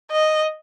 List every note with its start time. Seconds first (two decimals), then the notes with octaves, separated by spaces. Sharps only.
0.12 D#5